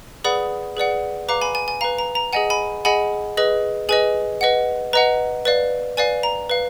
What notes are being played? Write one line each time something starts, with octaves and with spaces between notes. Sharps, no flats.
G#4 B4 D5 F#5 B5 D#6
G#4 B4 D5 F#5
B4 F5 A#5 D6
G#5 B5
G#5
G#5
B4 F5 A#5
A#5
A#5
G#4 D#5 F#5 G#5
G#5 B5
G#4 D#5 F#5 G#5 B5
G#4 B4 D#5
G#4 B4 D#5 G#5
B4 D#5 F#5
B4 D#5 F#5 A#5
B4 D5 F5
B4 D5 F5 G#5
A#5
B4 F5